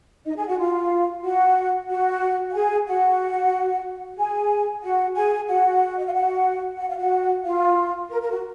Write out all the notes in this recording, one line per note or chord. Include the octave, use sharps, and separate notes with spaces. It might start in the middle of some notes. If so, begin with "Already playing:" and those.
D#4 D#5
G#4 G#5
F#4 F#5
F4 F5
F#4 F#5
F#4 F#5
F#5
G#4 G#5
F#4 F#5
G#4 G#5
F#4 F#5
G#4 G#5
F#4 F#5
D#5
F5
F#4 F#5
F#5
F5
F#4 F#5
F4 F5
A#4
A#4
F#4